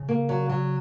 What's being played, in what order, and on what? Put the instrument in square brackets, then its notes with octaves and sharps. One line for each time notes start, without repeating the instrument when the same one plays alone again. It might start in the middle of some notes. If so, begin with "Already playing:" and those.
Already playing: [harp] C#3
[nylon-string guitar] A#3
F#3
F#3